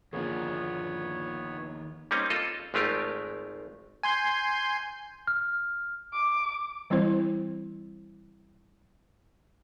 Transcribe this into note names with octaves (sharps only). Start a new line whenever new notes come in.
D#2 D3 F3 A#3 B3 G#4 C#5
G3 A#3 C4 C#4 D#4
F4 A4 D#5
G#1 G#3 A3 F4 G4 A#4
G#5 C6 G6
F6
D6
E3 G3 C4 E4 C5